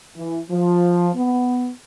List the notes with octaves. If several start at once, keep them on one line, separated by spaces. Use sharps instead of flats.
E3
F3
B3